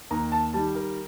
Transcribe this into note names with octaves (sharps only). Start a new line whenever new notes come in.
D#2 A#5
A5
D#3 G3 A5
A#4